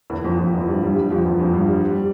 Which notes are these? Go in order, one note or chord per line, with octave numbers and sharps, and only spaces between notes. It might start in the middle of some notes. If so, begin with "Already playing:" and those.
E2 E3
F2 F3
F2 F3
E2 E3
G2 G3
G2 G3
G2 G3
F2 F3
E2 E3
F2 F3
G2 G3
G3
G3